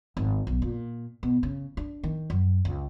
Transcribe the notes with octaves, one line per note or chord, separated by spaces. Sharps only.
G#1
B1
A#2
B2
C#3
D4
D#3
F#2
C#2